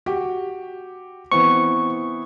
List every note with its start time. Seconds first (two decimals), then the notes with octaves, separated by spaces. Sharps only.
0.06 F#4 G4
1.32 E3 B3 C4 C#6